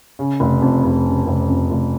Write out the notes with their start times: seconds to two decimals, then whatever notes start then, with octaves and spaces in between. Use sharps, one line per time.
0.19 C#3
0.40 F1
0.62 F2
0.84 F1
1.05 C#3
1.26 F1
1.49 F2
1.71 F1